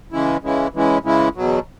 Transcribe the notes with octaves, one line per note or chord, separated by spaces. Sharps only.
C#3 E3 G#3 C#4 E4
C#3 E3 G#3 C#4 E4
C#3 E3 G#3 C#4 E4
C#3 E3 G#3 C#4 E4
E2 B2 F#3